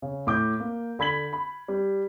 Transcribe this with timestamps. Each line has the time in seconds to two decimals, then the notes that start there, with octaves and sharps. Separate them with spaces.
0.02 C#3
0.27 A2 D6 G6
0.60 A#3
0.99 D3 B5 G#6 B6 F#7
1.33 B5
1.68 G3